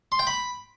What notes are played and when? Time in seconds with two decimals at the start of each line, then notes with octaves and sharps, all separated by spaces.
0.12 C6
0.19 G5
0.27 B5